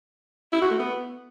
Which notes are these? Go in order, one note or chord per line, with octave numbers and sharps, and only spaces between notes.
E4
F#4
A3
B3